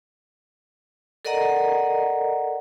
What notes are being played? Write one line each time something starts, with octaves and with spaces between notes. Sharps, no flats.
A4 A#4 D5 D#5 F#5 A#5